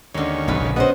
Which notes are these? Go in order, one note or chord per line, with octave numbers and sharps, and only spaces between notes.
D#2 D3 G#3 C#4
B1 E2 G2 G#4 B4
A#1 C#3
B3 C#4 F#4 C5 D#5